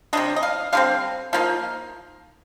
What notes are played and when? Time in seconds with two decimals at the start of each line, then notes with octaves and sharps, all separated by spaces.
0.13 C3 G3 D4 D#5
0.36 D#5
0.43 F5
0.73 D3 G3 C4 F5
1.33 F3 A#3 D#4 F5